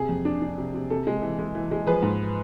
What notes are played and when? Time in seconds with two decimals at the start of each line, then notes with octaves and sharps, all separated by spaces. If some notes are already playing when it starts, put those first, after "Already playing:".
Already playing: C3 G#4
0.09 F2
0.25 D4
0.42 D4
0.58 C3
0.74 C3
0.90 C3 A4
1.07 G#3
1.22 E3
1.39 G#3
1.55 E3
1.71 G#3
1.87 F3 G#4 B4
2.02 G#2